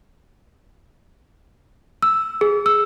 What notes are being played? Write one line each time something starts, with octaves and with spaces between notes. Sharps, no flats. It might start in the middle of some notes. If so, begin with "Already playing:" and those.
E6
G#4
E6